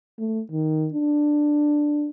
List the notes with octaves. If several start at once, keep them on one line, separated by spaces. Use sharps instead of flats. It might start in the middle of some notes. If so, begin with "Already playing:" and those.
A3
D#3
D4